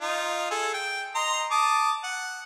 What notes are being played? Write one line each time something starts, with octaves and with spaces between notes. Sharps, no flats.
D#4 F4
G#4 A4
G5
D#5 A#5 C6
A5 D6 D#6
F#5